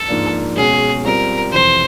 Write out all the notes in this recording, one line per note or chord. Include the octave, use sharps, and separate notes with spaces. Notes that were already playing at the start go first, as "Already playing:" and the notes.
Already playing: A4
G#2 F3 A#3 D4
B2 G#3 C#4 F#4 G#4
G3 C4 F4 A#4
F2 C3 E3 C5